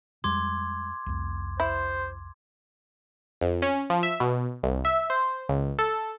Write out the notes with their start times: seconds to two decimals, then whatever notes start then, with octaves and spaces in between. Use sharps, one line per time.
0.24 F2 G3 G#3 C6 D6 G#6
1.06 C2 F2
1.60 E4 C5
3.41 F2
3.62 C#4
3.90 F3
4.03 E5
4.20 B2
4.63 C2
4.85 E5
5.10 C5
5.49 C#2
5.79 A4